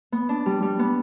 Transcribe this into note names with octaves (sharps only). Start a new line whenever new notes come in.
B3
D4
G3
G3
B3